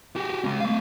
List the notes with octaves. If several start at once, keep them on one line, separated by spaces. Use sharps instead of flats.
F#4 G4
G#3 C#4
A3 F5